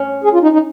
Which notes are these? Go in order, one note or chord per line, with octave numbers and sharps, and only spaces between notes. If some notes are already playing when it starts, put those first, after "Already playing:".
Already playing: C#4
G#4
F4
D#4
D#4